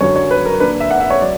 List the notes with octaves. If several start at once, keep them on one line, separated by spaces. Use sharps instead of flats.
F#2 D3 F#3 C#4 C#5
C#5
B4
A#4
D3 A#3 D4 B4
E5
F#5
E5
C#5
F#3 D5